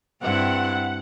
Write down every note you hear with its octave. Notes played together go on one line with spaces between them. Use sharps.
G2 C4 E4 F#5